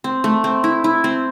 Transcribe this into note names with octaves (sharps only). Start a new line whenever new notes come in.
C4
A3
C4
E4
E4
C4